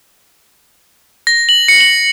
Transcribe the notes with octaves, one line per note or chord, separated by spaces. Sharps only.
A#6
F#7
C#7
F#7